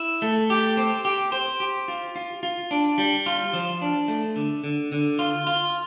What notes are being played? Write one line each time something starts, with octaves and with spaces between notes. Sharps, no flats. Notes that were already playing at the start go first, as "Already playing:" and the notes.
Already playing: E4
A3
G4
C4
G4
C5
G4
F4
F4
F4
D4
G3
F4
F3
D4
A3
D3
D3
D3
F4
F4